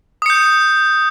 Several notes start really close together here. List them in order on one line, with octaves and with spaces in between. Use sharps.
D#6 C#7 G6